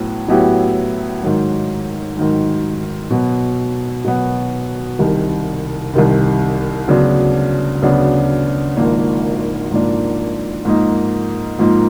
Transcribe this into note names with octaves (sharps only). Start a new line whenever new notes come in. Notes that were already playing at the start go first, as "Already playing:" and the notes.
Already playing: A2 F#3 B3
A2 F#3 B3 E4 G4
G#2 D#3 F#3
G#2 D#3 F#3
B2 F#3 B3
B2 F#3 B3
C2 C3 D#3
C2 C3 D#3
D2 C#3 F#3 B3 D4
D2 C#3 F#3 B3 D4
G#1 G#2 F3 A#3 D4
G#1 G#2 F3 A#3 D4
G#2 F3 A#3 D#4
G#2 F3 A#3 D#4